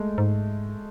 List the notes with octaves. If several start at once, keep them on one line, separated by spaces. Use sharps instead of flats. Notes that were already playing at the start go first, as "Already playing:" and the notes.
Already playing: G#3 A3
G#2